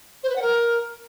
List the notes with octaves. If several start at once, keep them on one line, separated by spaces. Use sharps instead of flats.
C5
B4
F#5
A#4